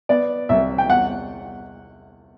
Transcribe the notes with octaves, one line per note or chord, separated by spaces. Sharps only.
B3 D5
C2 E5
G5
E2 F#5